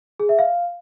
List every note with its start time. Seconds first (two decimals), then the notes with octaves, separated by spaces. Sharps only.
0.20 G#4
0.29 E5
0.39 F5